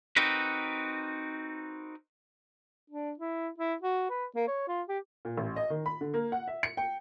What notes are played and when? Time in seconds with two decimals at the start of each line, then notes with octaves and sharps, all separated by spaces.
0.16 C4 D#4 F#4 A#4 B4
2.90 D4
3.19 E4
3.58 E4
3.82 F#4
4.10 B4
4.35 A#3
4.47 C#5
4.68 F4
4.89 G4
5.25 A#2
5.37 A1
5.56 D#5
5.70 D#3
5.86 B5
6.01 D3
6.14 A#3
6.32 F#5
6.48 E5
6.63 C#7
6.77 G5